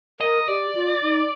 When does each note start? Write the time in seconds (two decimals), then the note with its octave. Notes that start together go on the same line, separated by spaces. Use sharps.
0.20 A#4 D#5
0.48 G4 D5
0.75 F4
1.02 D#4